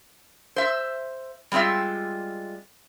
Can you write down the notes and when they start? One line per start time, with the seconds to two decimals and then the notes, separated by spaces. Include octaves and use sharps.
0.56 C5 E5
1.52 G3 G#3 C4 F4 E5